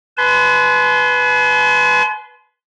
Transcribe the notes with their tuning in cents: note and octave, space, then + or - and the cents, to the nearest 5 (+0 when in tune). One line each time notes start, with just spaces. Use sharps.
B4 +0 G#5 +45 C6 -15